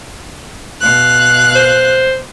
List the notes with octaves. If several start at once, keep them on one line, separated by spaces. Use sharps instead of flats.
B2 F5 F#6
C5